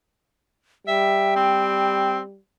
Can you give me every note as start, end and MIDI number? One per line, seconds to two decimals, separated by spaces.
0.87 2.38 55
0.87 1.31 76
0.87 2.16 79
1.36 2.20 60